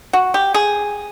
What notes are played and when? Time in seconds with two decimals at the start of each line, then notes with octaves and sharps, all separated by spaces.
0.13 F#4
0.34 G4
0.54 G#4